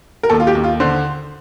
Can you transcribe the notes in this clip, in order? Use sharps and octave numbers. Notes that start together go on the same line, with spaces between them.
A#4
D#2 A4
F4
G4
D#2
F4
D3 C5